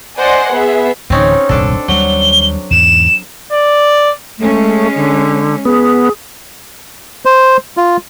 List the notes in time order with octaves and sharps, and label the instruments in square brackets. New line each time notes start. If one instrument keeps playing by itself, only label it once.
[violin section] C5 D5 D#5 F#5 G#5 C6
B3 G#4 E5
[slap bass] D1 D2 E3 [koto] C4 C#4 D#4
[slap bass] D#1 C2 F#2 [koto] D4 A4
[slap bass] D#2 G3 [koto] F#3 [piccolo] G7
[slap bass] E2 G#2 [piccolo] E7
[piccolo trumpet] D5
[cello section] G#3 C#4 [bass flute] A3
[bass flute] D3
[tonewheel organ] B3 [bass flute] G#4
[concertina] C5
F4